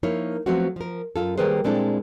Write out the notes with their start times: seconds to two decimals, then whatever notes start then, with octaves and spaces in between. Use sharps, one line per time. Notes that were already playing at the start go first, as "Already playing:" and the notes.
0.03 F3 A#3 D#4 E4 A#4 C#5
0.46 F3 F#3 A3 B3 C4 F#4
0.76 F3 A#4
1.16 F#2 F4 A4
1.38 D#3 G3 A#3 G#4 B4 C5
1.64 A#2 G#3 C4 D4 E4 A4